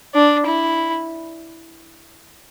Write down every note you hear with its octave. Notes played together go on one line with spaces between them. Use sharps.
D4
E4